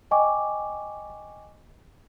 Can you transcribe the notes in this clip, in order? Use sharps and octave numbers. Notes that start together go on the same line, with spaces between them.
D#5 G5 G#5 C#6 D6